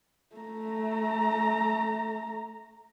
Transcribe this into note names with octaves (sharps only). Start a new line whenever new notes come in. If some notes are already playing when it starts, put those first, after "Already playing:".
A3 A#5